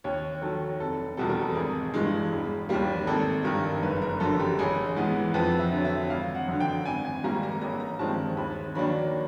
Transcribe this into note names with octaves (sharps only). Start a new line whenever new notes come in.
D#2 C#5
D#3 F#3 A4
F1 A4
E2 B2 G3 A4
A#4
A4
G#1 G#4
G2 E3 G#3
E1
D#2 D#3 G3 A#3
G#1 A4
G2 D#3 A#4
F#1 B4
A#4
F#2 D3 A4
G4
A1 G#4
G#2 E3 G#3 B3
F2 B4
E5
D3 F#3
E5
G#1 F5
F#5
F#2 D3
G5
G#1 G#5
G#5
G#2 D#3 G3 A#3 A#5
A#5
A1 A#5
A#5
G2 D#3 G#3 C4 A5
D#2 B5
D#3 F#3 A#3 D4 B5